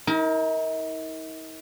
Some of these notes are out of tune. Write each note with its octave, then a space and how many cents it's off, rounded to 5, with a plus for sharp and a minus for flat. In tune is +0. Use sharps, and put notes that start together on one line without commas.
D#4 +45 A#4 +0